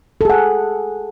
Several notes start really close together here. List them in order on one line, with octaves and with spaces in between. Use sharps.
A4 G#4 F#5